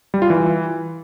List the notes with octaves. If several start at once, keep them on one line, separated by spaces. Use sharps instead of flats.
G3
F4
E3